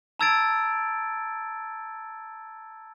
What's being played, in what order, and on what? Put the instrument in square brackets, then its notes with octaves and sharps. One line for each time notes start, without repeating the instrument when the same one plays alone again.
[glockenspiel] A5 A#5 E6 G#6 A6 D7